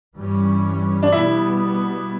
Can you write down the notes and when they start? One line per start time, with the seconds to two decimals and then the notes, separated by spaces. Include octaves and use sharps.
0.17 G2 E3 G3 C#4
1.03 D4
1.12 B2 G3 B3 E4